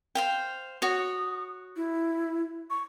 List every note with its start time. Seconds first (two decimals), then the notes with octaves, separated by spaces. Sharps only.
0.15 C5 F5 G5
0.82 F#4 C#5 D#6
1.76 E4
2.70 C#6